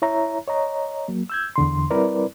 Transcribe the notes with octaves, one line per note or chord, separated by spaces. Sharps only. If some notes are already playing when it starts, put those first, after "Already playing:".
E4 C#5 E5 A#5
C#5 D#5 A#5
F#3 A#3
E6 G6 G#6
E2 D3 C6
G3 C4 E4 A#4 B4 D5